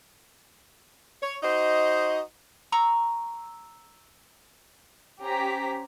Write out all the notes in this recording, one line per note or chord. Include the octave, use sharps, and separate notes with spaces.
C#5
D#4 F#4 C5 D#5
A#5 C#6 E6
C#4 G4 C5 A#5 B6